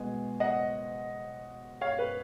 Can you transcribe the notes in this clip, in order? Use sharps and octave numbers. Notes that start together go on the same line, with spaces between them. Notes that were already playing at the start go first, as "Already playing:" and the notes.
Already playing: B2 G#3 B3 G#5
D#5 F#5
C#5 F5
B4